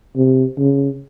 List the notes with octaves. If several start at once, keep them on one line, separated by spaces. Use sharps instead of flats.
C3
C#3